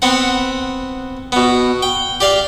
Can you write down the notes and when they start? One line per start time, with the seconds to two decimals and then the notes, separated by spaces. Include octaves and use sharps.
0.02 B3 C4 F#5
1.32 B2 B3
1.82 G5
2.20 G4 D5 F5